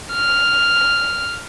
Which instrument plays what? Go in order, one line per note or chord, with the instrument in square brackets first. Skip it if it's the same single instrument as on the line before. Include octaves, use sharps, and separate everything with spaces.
[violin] F6